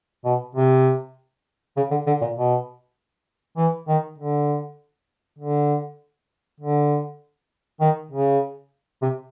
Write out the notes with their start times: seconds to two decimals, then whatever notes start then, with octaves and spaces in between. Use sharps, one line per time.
0.25 B2
0.55 C3
1.77 C#3
1.91 D3
2.06 D3
2.21 A#2
2.36 B2
3.57 E3
3.88 D#3
4.19 D3
5.38 D3
6.60 D3
7.80 D#3
8.11 C#3
9.02 C3